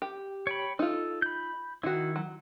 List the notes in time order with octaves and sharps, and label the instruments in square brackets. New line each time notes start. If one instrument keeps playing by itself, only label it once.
[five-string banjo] G4
[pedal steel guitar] C#5 G5 B5
[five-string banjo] D#4 F4 [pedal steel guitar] A4
[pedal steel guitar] B5 G6
[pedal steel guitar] D#3 E4 [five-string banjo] D#4 F#4
[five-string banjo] F#3